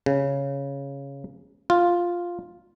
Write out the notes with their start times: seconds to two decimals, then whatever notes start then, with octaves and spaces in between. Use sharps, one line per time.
0.06 C#3
1.70 F4